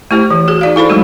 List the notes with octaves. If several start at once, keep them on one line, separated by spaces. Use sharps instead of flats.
A3 E4 G4 C5
E3
F#4 G#4
D#4 D5 F5
E4 A4 C5 B5
F#3 G#3 A3 D#4 F#4